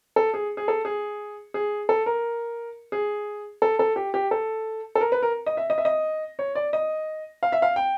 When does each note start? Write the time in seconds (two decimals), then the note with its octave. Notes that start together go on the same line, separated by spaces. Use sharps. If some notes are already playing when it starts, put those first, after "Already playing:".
0.16 A4
0.34 G#4
0.57 G#4
0.68 A4
0.85 G#4
1.54 G#4
1.89 A4
2.06 A#4
2.92 G#4
3.62 A4
3.79 A4
3.96 G4
4.14 G4
4.31 A4
4.95 A4
5.01 A#4
5.12 B4
5.23 A#4
5.46 D#5
5.57 E5
5.70 D#5
5.78 E5
5.85 D#5
6.39 C#5
6.55 D5
6.73 D#5
7.43 F5
7.52 E5
7.62 F5
7.76 G5